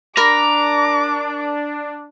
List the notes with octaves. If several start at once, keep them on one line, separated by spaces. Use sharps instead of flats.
D4 A#4 A#5 B5 D6